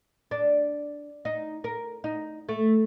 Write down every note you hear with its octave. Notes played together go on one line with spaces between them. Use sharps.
D4
D#4
A#4
D#4
A3